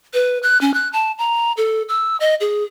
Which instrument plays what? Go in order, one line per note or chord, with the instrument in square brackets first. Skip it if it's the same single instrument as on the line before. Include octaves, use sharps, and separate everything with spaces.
[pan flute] B4
F#6
C#4
F#6
A5
A#5
A4
E6
D#5
G#4